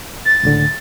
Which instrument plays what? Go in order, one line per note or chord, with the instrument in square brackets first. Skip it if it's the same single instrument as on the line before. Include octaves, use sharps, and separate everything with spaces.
[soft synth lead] A6
[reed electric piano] C#2 A2 D3